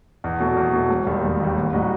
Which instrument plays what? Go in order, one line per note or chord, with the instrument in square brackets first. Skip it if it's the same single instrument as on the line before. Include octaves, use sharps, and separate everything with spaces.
[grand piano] E2
B2 F#3 A3
E2
B2 F#3 A3
E1
D#2 D#3 G3
E1
D#2 D#3 G3
A1
A2 G3 D#4 F#4